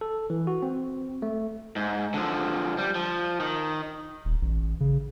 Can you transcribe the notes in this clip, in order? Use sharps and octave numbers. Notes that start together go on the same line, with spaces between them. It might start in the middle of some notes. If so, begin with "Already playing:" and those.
A4
E3
F#4
C4
A3
G#2
D3 F3
G3
F3
D#3
D#1
A1
C#3